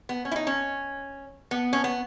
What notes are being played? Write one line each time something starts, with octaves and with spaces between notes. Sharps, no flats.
B3
C#4
E4
D#4
C#4
B3
C#4
B3